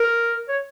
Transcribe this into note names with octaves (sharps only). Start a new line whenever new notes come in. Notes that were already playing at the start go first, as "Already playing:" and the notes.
Already playing: A#4
C#5